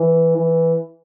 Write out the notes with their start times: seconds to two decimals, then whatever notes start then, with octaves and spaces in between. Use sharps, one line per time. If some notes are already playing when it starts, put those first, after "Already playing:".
Already playing: E3
0.37 E3